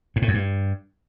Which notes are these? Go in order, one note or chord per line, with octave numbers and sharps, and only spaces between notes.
G#2
A2
F#2
G2